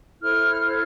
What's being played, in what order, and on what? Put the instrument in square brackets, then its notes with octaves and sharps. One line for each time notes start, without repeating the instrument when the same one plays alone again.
[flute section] E4 A4 C5 F6